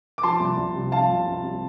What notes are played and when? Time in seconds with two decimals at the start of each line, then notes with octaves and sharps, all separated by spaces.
0.18 D6
0.23 F3 A5 C6
0.40 C2
0.57 C2
0.75 C3
0.92 F3 F5 A5
1.09 C2
1.27 C2
1.43 C3